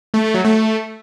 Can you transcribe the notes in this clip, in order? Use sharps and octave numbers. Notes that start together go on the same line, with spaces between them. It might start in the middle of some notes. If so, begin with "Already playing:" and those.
A3
A3
F#3
A3